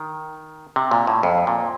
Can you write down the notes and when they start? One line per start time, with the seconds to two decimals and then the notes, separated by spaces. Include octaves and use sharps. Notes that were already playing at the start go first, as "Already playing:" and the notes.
Already playing: D#3
0.76 C3
0.91 A#2
1.07 A2
1.23 F2
1.47 A#2